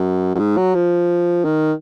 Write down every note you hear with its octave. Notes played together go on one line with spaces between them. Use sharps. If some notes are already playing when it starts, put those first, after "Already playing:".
Already playing: F#2
F#2
G#2
F#3
F3
D#3